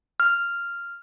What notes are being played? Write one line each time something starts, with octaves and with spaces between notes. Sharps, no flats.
F6